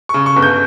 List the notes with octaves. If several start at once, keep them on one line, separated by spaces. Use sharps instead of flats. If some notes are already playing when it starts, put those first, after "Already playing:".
C#3 C#6
C#6
G1
G6